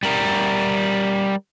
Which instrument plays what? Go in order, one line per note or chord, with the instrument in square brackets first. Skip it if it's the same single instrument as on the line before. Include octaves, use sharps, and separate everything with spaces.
[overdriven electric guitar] G3 A#4